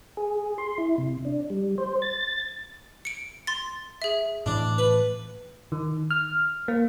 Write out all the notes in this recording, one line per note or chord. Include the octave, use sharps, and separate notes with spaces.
G#4
C6
E4
C3
D4
G3
C5
A6
C#7 D7
C6 A6
G#4 E5
A2 E3 D4
B4
D#3
F6
A#3